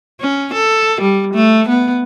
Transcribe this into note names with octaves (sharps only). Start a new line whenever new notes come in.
C#4
A4
G3
A3
B3